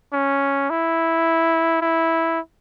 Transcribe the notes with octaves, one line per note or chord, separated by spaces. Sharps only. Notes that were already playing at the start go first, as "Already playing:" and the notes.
C#4
E4
E4